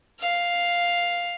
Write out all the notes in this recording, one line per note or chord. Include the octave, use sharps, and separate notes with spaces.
F5